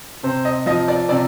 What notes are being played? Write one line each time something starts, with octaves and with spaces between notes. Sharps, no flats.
C3 C5
D#5
F3 D#5
D5
C3 D5